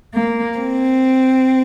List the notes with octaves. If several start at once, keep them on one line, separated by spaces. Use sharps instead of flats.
A#3
C4